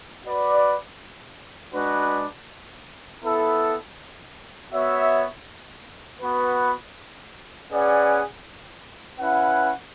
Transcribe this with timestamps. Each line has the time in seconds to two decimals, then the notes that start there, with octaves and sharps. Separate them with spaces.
0.24 F#4 B4 D5
1.73 G#3 D4 F#4 B4
3.22 B3 E4 A4
4.72 B3 F#4 C#5 E5
6.21 B3 F#4 B4
7.70 C#4 G#4 B4 D5 F#5
9.18 C#4 E4 B4 F#5